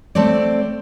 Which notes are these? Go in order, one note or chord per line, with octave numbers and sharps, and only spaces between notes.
A3 C4 C5 D5